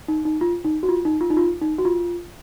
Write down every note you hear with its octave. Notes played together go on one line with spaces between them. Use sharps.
D#4
D#4
F4
D#4
F#4
F4
D#4
F4
D#4
F4
D#4
F#4
F4